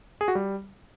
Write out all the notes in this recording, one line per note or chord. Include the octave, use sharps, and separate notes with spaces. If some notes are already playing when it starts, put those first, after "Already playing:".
G#4
F#4
G3